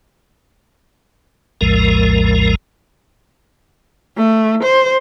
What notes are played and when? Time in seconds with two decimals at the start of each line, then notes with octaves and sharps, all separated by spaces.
1.61 A#1 E2 A2 F3 G#3 A#4
4.17 A3
4.63 C5